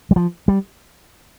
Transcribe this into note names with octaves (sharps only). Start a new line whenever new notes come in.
G3
F3
G3